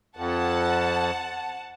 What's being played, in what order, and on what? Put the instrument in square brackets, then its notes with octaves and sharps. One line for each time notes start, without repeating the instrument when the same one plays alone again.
[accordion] F2 [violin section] F#5 A5